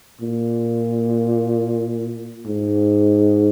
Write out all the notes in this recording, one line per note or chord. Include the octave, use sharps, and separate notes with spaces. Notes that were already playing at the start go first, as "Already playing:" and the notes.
A#2
G#2